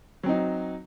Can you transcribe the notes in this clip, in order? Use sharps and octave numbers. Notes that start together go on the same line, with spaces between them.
F#3 C4 D#4